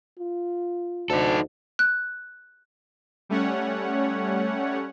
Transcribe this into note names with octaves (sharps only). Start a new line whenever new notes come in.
F4
D2 D#4 A4
F#6
G3 A3 C#4 C#5 F#5